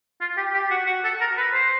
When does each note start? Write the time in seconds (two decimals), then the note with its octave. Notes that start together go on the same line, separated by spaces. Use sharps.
0.21 F4
0.37 G4
0.54 G4
0.71 F#4
0.87 F#4
1.04 A4
1.21 A#4
1.38 B4
1.54 C5